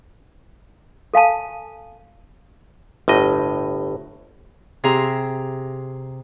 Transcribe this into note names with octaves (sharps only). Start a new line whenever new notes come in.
A4 F5 G#5 A5
G1 A2 D#5
C3 G#4 E5 A#5